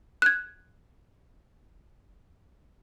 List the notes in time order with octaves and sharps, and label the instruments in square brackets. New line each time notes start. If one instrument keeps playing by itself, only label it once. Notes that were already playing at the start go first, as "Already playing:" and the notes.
[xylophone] F#6 G#6